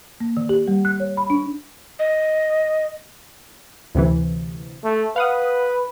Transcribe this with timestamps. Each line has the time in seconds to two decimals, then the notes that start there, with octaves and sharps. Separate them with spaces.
0.20 A#3
0.37 D#3
0.49 G4
0.68 G3
0.85 F#6
1.00 C#5
1.17 B5
1.30 D4
1.99 D#5
3.95 D2 C3 E3
4.84 A3
5.16 B4 F5 F#5 D#6